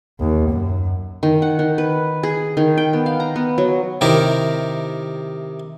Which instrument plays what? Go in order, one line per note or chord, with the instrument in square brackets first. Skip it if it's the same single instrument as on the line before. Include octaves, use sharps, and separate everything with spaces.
[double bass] D#2
F#2
[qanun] D#3
F#5
D#3
B4
G#4
D#3
G5
B3
F5
A#5
B3
F#3
[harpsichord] C3 D#3 E4 G4 A#4